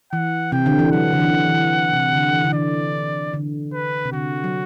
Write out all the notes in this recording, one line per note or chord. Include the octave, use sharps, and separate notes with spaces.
E3 F#5
C3 G5
D3
E3
F#3 F#5
D3
E3
E3
C3
D3
E3
D3
E3 D5
D3
B4
C3
D3 F#4
F#3